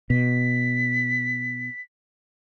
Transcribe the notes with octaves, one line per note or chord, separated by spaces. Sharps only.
B2 B6